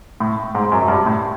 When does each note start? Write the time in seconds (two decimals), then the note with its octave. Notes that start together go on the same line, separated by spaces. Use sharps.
0.20 A2
0.55 G#2
0.72 F#2
0.88 G2
1.06 A2